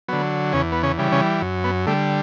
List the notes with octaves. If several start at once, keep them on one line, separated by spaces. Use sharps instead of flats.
D3 F#3 B3
E2 C#3 C#4
B3
C#3 C#4
C#3 E3 G3
C#3 C#4
F#2
B3
D3 G3 A3